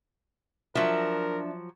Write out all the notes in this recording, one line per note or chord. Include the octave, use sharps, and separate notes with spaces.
F3 F#3 D4 A#4 E5